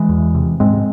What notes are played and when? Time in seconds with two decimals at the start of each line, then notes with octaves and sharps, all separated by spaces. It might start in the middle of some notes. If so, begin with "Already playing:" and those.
Already playing: E3 G#3
0.09 E2
0.35 C3
0.60 G#2 G#3 C4